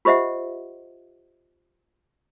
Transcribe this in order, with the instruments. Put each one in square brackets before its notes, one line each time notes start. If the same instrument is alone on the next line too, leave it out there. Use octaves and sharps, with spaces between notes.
[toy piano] F4 G4 C5 D#5 E5 F#5